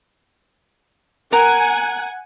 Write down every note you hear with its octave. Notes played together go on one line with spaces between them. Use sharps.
A#4 F#5 G#5